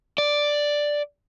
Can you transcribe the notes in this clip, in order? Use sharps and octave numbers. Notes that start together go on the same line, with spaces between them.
D5